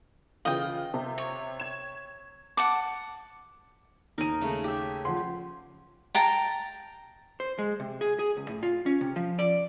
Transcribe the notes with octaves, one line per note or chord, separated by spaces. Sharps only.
C#3 E3 F4 D#5 G5
C3
C#5
G#6 E7
F#5 A5 D6
D#2 D#4 A#4 D#7
C#3 G#3 A3
G4 E5
F3 F#5 C6
G5 A5 A#5
C5
G#3
C3
G#4
G#4
C#2
A2
F4
C#4
C3
F3
D5